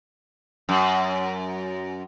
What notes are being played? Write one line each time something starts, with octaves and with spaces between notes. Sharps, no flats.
F#2